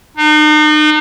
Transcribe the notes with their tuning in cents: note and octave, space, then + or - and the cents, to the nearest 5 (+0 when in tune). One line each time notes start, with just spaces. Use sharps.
D#4 -40